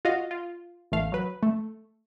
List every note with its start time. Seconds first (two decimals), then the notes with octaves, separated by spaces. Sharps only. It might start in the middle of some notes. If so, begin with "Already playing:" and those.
0.05 F4 F#4 D#5 F5
0.31 F4
0.92 A1 E2 A3 F5
1.12 F#3 B4
1.43 A3